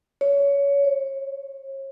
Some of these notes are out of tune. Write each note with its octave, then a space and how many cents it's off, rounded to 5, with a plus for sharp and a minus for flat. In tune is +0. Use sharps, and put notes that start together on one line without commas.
C#5 +20
C#5 -35